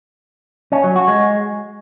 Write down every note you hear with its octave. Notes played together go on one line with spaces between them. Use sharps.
C#4
F#3
F#4
G#3